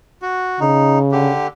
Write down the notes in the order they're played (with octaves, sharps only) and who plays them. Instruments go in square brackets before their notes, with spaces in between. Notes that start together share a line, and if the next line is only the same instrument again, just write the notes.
[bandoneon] F#4
[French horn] C#3 [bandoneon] D#4
[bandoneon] D3 G4